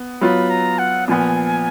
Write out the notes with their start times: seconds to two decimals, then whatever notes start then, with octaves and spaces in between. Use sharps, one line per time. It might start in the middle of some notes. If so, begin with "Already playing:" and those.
Already playing: B3
0.21 F#3 B3 F4 B5
0.50 A#5
0.79 F#5
1.08 A#2 F3 B3 G#5